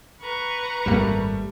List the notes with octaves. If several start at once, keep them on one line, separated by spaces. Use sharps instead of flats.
B4 A#5 C#6
G#1 F#2 G3 A3 A#3